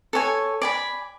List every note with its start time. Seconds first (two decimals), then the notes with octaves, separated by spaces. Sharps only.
0.13 A4 C#5 G#5
0.62 D5 G#5 B5